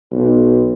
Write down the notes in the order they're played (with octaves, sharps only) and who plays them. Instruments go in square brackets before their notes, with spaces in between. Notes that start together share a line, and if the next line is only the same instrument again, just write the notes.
[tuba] B1